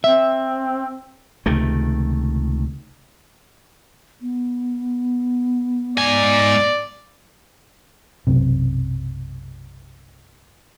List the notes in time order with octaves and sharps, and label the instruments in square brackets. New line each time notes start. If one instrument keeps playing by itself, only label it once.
[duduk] C4 [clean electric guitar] E5
[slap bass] C#2 C3 D#3 A3
[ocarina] B3
[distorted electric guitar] G#2 G#5 [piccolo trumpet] D5
[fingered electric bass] B1 F#2 C3